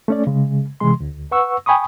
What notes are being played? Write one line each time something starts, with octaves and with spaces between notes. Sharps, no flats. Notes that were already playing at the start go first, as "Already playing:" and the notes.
A3 C#4 D5
C#3 G#3
C3 E3 G#3 C6
D2
B4 F#5 C#6 E6
G5 G#5 B5 C#6 D#6